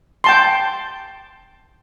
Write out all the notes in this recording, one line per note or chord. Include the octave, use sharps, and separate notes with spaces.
G5 A5 C6